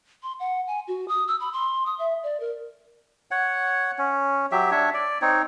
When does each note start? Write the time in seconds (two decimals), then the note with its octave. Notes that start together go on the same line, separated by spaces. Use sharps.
0.23 C6
0.40 F#5
0.67 G#5
0.88 F#4
1.08 D#6
1.28 E6
1.40 B5
1.53 C6
1.86 D#6
1.99 E5
2.23 D5
2.40 A#4
3.31 C#5 F#5
3.98 C#4
4.52 F#3 G4 E5
4.71 D4 C#5 E5
4.94 D5
5.21 C4 D#4 C#5